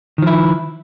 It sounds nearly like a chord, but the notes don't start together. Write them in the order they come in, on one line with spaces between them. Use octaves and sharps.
D#3 F3 E4